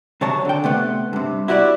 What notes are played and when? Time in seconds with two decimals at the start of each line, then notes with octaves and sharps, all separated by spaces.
0.21 C3 F#3 C#5 A5 A#5
0.45 D3 G5
0.64 C3 A3 B3
1.13 G2 C3
1.48 E4 F#4 G4 B4 D5